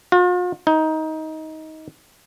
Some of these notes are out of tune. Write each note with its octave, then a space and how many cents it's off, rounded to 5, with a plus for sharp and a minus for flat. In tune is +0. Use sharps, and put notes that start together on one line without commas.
F4 +45
D#4 +20